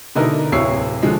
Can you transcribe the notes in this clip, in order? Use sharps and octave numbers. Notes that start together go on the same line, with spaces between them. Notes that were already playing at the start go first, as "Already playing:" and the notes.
B2 D3 D#4 E4 A#4
D1 C3 E4 C#5 C7
D3 F3 G#3